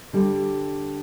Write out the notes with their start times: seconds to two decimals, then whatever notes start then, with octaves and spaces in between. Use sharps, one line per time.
0.13 D3 G3